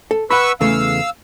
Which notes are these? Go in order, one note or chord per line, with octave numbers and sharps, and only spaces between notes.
A4
B4 F#5 B5 C#6 E6
E2 C#3 A3 F5 E6